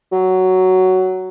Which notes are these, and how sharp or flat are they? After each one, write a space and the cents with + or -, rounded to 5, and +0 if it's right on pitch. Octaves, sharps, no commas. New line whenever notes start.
F#3 +10